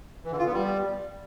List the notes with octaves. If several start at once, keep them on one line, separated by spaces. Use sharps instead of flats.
E3
D3
F4
B3
G3